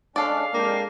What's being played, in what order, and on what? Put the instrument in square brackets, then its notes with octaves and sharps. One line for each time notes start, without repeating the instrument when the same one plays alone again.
[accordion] G#3 C#4 D4 [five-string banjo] A4 D5 [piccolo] F5
[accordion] F2 G5 [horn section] G#3 A#3 D4